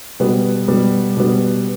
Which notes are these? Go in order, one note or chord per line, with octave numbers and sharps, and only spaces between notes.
B2 G3 B3
B2 G3 B3
B2 G3 B3